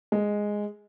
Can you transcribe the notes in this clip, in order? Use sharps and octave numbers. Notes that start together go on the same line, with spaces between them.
G#3